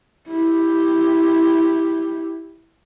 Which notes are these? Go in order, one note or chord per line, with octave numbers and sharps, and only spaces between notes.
E4 G4